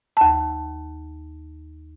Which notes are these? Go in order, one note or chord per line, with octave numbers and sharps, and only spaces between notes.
D#2 A5